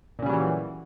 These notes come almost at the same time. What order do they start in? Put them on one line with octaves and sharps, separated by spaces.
A#2 C#3 G3 F#3 E3